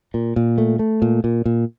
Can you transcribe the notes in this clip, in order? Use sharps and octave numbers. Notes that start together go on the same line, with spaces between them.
A#2
A#2
A3
A3
A#2
A#2
A#2